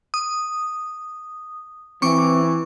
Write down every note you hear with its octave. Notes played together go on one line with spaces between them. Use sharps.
D#6
E3 C4 C#6 D6